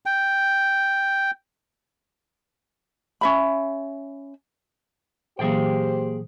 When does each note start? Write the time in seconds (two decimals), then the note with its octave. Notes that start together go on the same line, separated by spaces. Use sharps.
0.06 G5
3.21 C#4 E5 B5
5.39 A#2 E3 F#3 A#3 G4 G#4 C5 G5